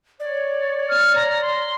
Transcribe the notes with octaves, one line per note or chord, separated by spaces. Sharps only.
C#5 D5
F6
A#5
C6